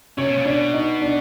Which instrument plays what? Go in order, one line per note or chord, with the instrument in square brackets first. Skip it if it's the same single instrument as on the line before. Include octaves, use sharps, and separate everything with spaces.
[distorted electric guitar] C3 [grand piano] C#4 C#5
[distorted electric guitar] B2
A#2
[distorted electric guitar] B2 [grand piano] D4 D5
[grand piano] D#4 D#5
D4 D5